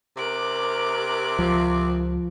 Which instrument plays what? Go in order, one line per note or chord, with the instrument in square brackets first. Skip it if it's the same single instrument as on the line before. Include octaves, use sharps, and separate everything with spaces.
[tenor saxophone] C3 [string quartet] A#4 D6 F#6
[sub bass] C#2 [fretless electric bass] F3